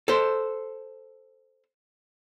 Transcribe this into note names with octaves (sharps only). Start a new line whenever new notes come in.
A4 C5